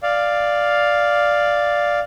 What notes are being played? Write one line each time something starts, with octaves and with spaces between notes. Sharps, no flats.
D5 F5